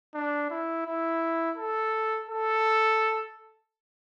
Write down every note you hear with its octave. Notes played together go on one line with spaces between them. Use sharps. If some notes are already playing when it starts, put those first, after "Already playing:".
D4
E4
E4
A4
A4